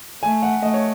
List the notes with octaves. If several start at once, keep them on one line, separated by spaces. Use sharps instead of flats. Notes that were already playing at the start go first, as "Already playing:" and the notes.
A3 G#5
F#5
A3 D#5
C#5